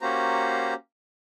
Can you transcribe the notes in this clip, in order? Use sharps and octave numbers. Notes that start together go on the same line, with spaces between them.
A#3 C#4 F#4 G4 C5 A#5